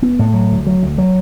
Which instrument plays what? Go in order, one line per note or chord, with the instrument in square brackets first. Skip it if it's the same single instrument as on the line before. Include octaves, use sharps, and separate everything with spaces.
[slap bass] B3
A2
F#3
D2
F#3
D2
F#3